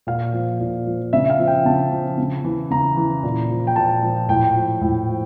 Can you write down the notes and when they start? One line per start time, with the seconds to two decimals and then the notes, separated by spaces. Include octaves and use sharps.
0.07 A#2 F5
0.33 F3
0.60 A#2
0.86 F3
1.13 C#3 E5
1.30 F5
1.39 F3
1.47 G5
1.65 C#3 A5
1.92 F3
2.18 C#3
2.44 E3
2.70 C#3 A#5
2.97 E3
3.23 A#2
3.51 F3
3.67 G5
3.76 A#2 A5
4.03 F3
4.29 A2 G5
4.56 F3
4.81 A2
5.08 F3